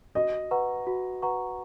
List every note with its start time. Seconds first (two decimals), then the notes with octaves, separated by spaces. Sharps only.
0.15 F#4 D#5
0.51 B4 F#5 A#5 C#6
0.87 F#4
1.22 B4 F#5 A#5 C#6